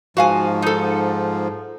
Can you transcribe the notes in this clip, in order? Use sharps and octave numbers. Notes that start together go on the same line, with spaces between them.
G#2 F3 F#4 F5 G#5
D#4 A4